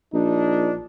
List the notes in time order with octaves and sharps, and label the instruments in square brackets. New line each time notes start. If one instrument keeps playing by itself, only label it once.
[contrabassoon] A#1 [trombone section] D4 D#4